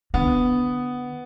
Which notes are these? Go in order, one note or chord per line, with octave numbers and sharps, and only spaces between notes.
D3 B3